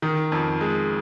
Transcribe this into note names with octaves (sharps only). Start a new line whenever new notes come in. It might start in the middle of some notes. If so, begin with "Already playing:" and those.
D#3
F2
G#3